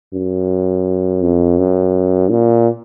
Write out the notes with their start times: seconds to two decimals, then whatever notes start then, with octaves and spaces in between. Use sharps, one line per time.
0.14 F#2
1.22 F2
1.58 F#2
2.31 A#2